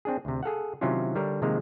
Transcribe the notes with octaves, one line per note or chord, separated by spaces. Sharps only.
C4 D4 G#4
D2 C3
G#4 A4 F5 F#5
C3 D#3 F#3 C#4 E4 F4
D3 G3 D4 A#4 C#5
C3 D#3 F3 G#3 A#3